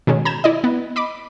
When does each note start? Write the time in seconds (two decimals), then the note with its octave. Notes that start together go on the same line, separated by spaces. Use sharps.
0.07 B2 D#3 G#3 C#4
0.25 A#5 B5 G6 G#6 E7
0.44 E4 D5 D#5
0.64 B3
0.96 D#5 B5 D6